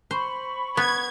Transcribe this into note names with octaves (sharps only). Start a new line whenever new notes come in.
C5 B5 C#6
B3 G#6